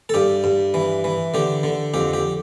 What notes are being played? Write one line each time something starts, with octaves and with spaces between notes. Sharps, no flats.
A4
G2 G4
G2
E3
E3
D3 G4
D3
F2 G4
G4